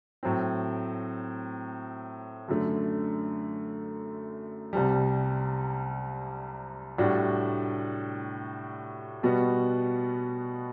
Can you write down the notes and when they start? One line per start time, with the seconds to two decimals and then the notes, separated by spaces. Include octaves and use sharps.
0.23 A2 F#3 C4
2.48 F#2 D3 A3
4.73 C2 C3 G3
6.98 A2 G3 D4 F#4
9.23 B2 G3 B3 F#4